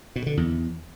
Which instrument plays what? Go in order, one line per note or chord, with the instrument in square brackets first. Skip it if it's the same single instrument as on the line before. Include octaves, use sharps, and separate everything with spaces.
[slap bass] B2
D3
E2